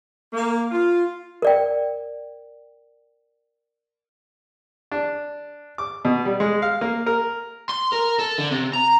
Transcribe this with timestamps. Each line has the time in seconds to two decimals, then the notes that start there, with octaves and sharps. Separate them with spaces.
0.33 A#3
0.71 F4
1.42 A#4 D5 G5
4.92 D4
5.78 D6
6.05 B2
6.25 G3
6.40 G#3
6.62 F5
6.81 A#3
7.06 A#4
7.69 C6
7.92 A#4
8.19 A4
8.38 D3
8.51 C3
8.73 A#5